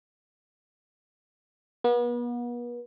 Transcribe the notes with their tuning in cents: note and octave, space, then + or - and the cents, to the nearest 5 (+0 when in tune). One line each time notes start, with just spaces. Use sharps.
B3 -40